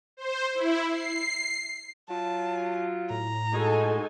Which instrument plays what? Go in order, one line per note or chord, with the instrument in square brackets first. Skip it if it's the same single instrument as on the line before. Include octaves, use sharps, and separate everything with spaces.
[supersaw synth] C5
E4
C7
[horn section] F#3 F4 [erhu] A5
[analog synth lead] A2 [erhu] A#5
[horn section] G#3 F#4 [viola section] D#4 A4 G#5